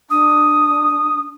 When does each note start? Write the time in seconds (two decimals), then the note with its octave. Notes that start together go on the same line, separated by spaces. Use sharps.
0.10 D4 D#6